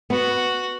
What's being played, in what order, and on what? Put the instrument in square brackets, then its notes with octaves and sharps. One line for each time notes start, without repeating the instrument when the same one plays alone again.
[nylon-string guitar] B3 [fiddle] F#4